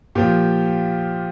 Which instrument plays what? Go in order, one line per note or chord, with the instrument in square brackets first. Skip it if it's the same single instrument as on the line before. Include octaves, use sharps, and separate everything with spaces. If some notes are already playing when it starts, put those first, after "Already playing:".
[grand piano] A#2 F3 G4